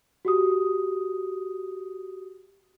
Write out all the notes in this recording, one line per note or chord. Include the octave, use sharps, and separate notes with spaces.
F#4 G4 D#6